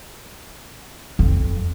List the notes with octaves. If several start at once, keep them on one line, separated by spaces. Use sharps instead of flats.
F2